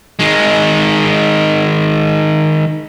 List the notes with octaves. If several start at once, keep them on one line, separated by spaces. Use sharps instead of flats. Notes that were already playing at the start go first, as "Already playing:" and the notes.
D#3 G#3